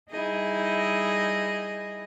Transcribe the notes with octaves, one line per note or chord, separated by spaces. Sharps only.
G3 D#4 E4 G#4 D#5